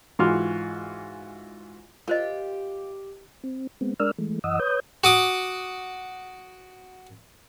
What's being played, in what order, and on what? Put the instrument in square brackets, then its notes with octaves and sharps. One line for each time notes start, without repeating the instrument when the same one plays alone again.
[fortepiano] G#2 E3 F4 F#4 C6 F6
[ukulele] F4 [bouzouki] G4 [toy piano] A#4 C5 D#5
[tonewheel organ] C4
G#3 B3 C4
G#3 D4 A#4 D5 E6 F6
E3 G#3 A3
F#2 E3 D#5 F#5 D#6 E6
B4 C#5 D#6 G6
[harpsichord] F#4 D6 D#6